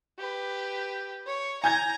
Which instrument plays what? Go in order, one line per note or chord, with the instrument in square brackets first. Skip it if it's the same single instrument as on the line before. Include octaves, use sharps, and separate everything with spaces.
[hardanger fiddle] G4 B4
C#5
[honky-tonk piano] G#5 G6 G#6 [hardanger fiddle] A#5